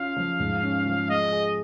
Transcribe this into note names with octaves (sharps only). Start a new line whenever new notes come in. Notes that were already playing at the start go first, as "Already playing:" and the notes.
Already playing: C#4 F4 F5
F3
G#2
C#4
F3
G#3 D#5
G#4